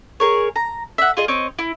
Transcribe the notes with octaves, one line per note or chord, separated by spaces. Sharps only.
G#4 A#4 C#5
A#5
E5 F#5
F4 G#4 D#5
C4 C#5 D#5
E4